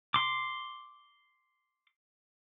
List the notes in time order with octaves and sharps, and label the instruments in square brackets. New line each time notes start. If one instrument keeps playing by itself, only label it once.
[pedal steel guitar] C6 D6